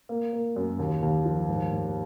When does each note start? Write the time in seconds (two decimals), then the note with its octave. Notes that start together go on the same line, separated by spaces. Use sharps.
0.09 A#3
0.33 A#3
0.56 F#2
0.79 D#2
1.02 D#2
1.25 F3
1.48 G#2
1.71 G#2